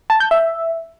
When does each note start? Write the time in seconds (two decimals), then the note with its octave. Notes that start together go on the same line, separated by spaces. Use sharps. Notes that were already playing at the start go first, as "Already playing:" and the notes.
0.10 A5
0.20 G6
0.31 E5